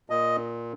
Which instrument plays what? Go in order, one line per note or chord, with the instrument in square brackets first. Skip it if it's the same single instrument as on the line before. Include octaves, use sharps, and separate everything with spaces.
[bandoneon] A#2 D#5